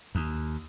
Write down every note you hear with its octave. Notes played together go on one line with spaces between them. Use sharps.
D#2